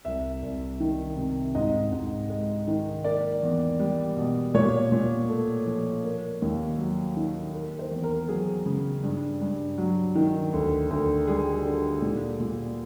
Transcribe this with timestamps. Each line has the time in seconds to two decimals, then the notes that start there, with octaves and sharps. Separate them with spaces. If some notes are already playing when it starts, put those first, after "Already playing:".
0.05 C2 E5
0.43 C2
0.80 D#3
1.17 C3
1.55 G#2 D#5
1.92 G#2
2.29 G#3
2.67 D#3
3.04 A#3 D5
3.42 E2
3.79 G3
4.16 B2
4.54 A#2 C#5
4.92 A#2
5.28 A3
5.66 F3
6.04 A#3
6.42 D#2
6.78 F#3
7.17 D#3
7.54 A#3
7.79 C5
7.91 E2
8.04 A#4
8.29 F#3 G#4
8.66 C#3
9.03 G2
9.41 G2
9.78 F#3
10.15 D#3
10.53 D2
10.90 D2
11.27 G3 G#4
11.65 D3
12.02 A#2
12.40 A#2